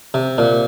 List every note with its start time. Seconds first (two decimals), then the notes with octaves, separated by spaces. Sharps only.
0.14 C3
0.38 A#2